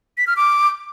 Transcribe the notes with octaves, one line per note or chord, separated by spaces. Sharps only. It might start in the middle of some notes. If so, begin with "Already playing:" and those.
B6
F6
D6